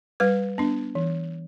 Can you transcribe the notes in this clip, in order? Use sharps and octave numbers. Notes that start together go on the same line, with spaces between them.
G3 B4
B3 D4
E3